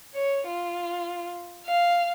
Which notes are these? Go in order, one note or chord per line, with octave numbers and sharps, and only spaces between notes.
C#5
F4
F5